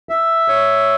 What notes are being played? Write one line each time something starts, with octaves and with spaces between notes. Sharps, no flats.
E5
C#5